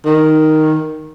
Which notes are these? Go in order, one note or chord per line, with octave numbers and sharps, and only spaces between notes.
D#3